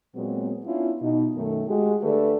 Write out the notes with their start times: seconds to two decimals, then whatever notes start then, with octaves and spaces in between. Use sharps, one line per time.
0.15 A#2 F#3 G#3 B3 C4 F#4
0.66 B3 C#4 D4 E4 F4
1.01 B2 D#4
1.35 F#2 B2 D#3 A3
1.67 G#3 F#4 G4
2.02 D3 A3 G4 A4 B4 D5